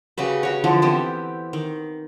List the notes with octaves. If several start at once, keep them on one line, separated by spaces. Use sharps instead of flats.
C#3 G3 F#4 B4
F#4 C#5
D3 E3 F3 A4
B3 C4 E4 G4
D#3